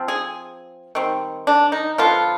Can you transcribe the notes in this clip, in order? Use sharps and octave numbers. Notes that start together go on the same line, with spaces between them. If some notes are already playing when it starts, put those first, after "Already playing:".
Already playing: F3 C4
G#4
D#3 G3 C4
D4
D#4
D3 F3 B3 D4 F4